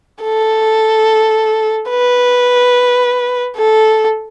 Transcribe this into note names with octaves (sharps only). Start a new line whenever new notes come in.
A4
B4
A4